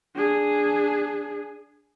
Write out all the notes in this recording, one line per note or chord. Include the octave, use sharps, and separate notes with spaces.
D4 G#4